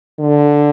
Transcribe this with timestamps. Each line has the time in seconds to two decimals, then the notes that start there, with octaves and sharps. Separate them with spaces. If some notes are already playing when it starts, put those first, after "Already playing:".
0.20 D3